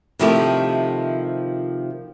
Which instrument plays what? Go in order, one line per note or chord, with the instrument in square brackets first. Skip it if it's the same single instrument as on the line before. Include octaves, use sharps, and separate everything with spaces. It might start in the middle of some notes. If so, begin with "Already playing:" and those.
[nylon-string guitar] C3 D#3 F3 A3 E4 G4